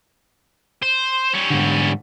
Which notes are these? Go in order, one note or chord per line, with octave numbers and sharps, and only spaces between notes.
C5
G3 C#4
G#2 D3